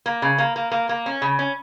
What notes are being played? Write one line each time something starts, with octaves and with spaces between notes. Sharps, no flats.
A#3
C#3
A#3
A#3
A#3
A#3
C#4
C#3
C#4